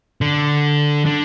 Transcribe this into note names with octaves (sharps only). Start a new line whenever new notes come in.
D3
D3